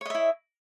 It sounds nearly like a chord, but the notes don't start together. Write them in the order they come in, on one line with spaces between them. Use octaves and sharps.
C#5 D#5 E5 E4